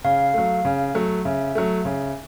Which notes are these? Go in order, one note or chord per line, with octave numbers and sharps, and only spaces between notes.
C#3 F5
F#3 A3
C#3
F#3 A3
C#3 E5
F#3 A3
C#3